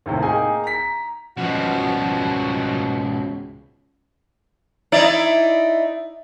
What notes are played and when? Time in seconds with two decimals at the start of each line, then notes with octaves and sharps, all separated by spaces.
0.06 D#2 A2 C3 D#3
0.23 A#3 D#4 G#4 G5 G#5
0.64 A#5 B6
1.37 C#2 G#2 B2 F3 G3 F#4
4.92 D#4 E4 D5